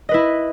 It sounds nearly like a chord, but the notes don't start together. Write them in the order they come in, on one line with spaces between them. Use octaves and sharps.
D#5 B4 E4